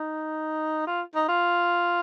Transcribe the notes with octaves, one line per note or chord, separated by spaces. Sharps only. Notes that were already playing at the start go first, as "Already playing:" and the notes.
Already playing: D#4
F4
D#4
F4